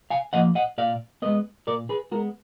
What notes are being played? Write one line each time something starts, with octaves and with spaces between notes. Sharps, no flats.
F5 G#5
F3 A#3 D#5 F#5
D#5 F#5
A#2 D5 F5
G#3 B3 B4 D#5
A#2 A#4 D5
G#4 B4
G#3 B3 F#4 A#4